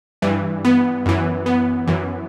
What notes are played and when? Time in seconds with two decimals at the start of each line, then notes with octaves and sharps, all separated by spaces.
0.22 G2 E3
0.65 B3
1.06 F#2 E3
1.46 B3
1.87 F#2 E3